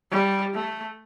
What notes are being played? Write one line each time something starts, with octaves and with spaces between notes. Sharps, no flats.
G3
A3